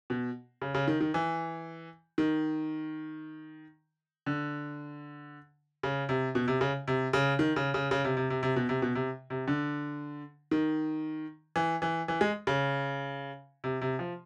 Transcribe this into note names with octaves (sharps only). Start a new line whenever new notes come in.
B2
C#3
C#3
D#3
D#3
E3
D#3
D3
C#3
C3
B2
C3
C#3
C3
C#3
D#3
C#3
C#3
C#3
C3
C3
C3
C3
B2
C3
B2
C3
C3
D3
D#3
E3
E3
E3
G#3
C#3
C3
C3
F3